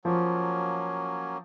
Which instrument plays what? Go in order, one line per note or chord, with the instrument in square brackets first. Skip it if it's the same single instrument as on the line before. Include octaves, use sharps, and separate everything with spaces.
[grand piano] F3 [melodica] F#3 A#3 C#4